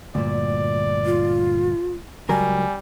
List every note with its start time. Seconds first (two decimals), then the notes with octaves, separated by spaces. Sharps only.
0.15 D2 G2 A#2 D5
1.06 F4
2.29 C#2 F#3 G3 A#4 G#5